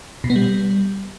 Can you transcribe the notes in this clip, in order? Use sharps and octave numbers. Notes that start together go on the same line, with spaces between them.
B2
B3
G3